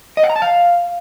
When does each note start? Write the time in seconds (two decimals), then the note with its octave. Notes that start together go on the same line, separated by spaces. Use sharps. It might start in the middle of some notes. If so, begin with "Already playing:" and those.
0.17 D#5
0.23 F#5
0.30 A#5
0.36 A5
0.42 F5